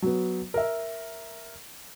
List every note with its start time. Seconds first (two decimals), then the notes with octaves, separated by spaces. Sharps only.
0.02 F#3 B3
0.54 A#4 E5